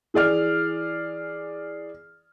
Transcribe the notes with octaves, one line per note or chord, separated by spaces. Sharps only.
E3 G#4 D5 F6